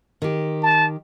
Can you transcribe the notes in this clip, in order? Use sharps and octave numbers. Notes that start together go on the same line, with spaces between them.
D#3 G4
A5